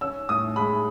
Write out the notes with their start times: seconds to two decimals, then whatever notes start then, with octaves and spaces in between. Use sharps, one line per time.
0.01 C#4 E6
0.29 A2 D#6
0.56 G#3 B5